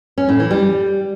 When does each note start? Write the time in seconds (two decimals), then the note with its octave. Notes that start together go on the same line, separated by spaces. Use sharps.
0.18 C#4
0.29 A2
0.40 E3
0.51 G3